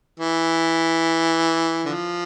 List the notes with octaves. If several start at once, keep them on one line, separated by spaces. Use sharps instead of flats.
E3
D3 F3